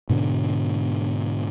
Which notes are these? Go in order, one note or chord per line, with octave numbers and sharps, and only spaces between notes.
G#2 B2 D3